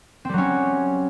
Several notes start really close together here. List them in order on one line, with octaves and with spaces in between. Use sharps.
C4 G3 F#3 C#4